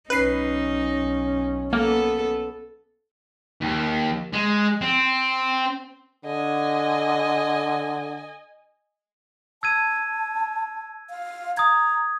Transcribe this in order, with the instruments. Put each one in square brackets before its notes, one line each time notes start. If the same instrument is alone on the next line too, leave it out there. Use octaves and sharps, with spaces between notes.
[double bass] B1 C#4 [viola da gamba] D#4 [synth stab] B4 C7
[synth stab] A#3 [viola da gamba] B3 A4
[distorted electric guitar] D#2
G#3
C4
[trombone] D3 [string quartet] D#5 G#5
[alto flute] A5 [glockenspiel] E6 G#6 D#7
[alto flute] F5
[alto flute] A#5 [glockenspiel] D#6 G#6